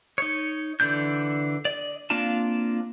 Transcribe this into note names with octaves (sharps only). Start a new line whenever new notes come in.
D#4 C#5
D3 E3 D4 G6
D5 D#5
A#3 C4 D4 F4 A5